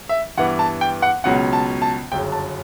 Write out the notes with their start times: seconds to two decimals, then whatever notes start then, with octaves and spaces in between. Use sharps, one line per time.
0.09 E5
0.37 G2 E3 B3 F#5
0.59 A5
0.81 G5
1.02 F#5
1.24 C#2 B2 F#3 C#4 F#5
1.53 A5
1.82 A5
2.12 G1 F#2 C#3 G5
2.32 A5